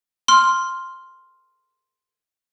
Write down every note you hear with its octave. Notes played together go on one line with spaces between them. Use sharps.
C6 F6